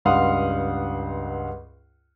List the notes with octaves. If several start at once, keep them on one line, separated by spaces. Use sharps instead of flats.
C#2 G2 F5 F#5 C6 D#6